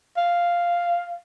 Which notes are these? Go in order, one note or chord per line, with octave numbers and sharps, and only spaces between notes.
F5